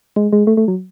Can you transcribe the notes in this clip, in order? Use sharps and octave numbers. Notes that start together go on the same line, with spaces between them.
G#3
G#3
A3
A3
F#3